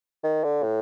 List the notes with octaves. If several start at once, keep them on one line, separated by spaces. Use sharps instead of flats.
D#3
D3
A2